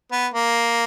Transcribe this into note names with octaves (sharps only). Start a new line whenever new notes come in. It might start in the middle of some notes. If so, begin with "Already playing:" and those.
B3
A#3